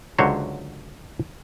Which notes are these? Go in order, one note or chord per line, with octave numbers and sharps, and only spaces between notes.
C#2 D3 F#3 F#4 C5 C#5